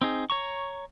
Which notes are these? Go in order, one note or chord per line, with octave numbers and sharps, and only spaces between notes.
C4 D#4 G#4
C#5 A#5 C#6